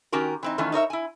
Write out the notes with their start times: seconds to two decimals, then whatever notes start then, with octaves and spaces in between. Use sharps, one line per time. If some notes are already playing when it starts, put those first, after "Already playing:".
0.12 D#3 C#4 F#4 G4 A#4
0.43 E3 C4 D#4
0.58 D#3 E3 A3 C#4 F4
0.72 D#4 A#4 C#5 E5
0.90 E4 G#5